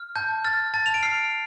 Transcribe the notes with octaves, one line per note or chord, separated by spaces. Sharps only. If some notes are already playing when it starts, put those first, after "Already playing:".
Already playing: F6
A5 G6
F6 A6
A5 A6
F7
D7
F6 C7